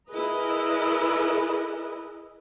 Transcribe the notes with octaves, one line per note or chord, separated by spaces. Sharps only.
E4 G#4 A#4 B4 D#5